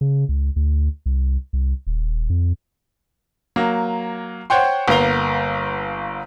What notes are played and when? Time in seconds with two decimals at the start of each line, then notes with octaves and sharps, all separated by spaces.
0.01 C#3
0.29 C#2
0.56 D2
1.06 C2
1.53 C2
1.87 D#1
2.30 F2
3.56 F#3 A#3
4.50 C5 C#5 F#5 G5 C6
4.88 G1 A#3 B3 F5 A#5 G7